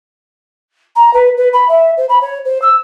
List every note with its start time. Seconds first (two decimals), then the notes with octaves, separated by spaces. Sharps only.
0.96 A#5
1.14 B4
1.37 B4
1.53 B5
1.69 E5
1.97 C5
2.09 B5
2.21 C#5
2.45 C5
2.62 E6